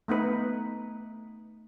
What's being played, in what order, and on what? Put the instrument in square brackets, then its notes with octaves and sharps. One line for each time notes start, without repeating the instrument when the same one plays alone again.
[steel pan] A3 B3 D#4 B4